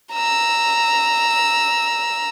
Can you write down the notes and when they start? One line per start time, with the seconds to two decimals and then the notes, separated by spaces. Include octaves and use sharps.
0.12 A#5 E6